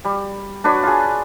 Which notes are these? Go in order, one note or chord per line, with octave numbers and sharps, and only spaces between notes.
G3
D4 F#4 B4 C#5
F4 G#4